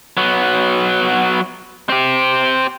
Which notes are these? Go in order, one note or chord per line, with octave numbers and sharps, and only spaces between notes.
F#3 B3
C4 G4